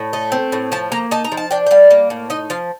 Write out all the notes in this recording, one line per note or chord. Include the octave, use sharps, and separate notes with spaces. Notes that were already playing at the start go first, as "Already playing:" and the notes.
Already playing: A2
A3 D#5
C4
A2
F3 A5
A#3 A#5
D#4 A5
A#5
F3
A5
D4 G5
G5
G3 F5
A#3
A2
D#4 D#5
F3 F5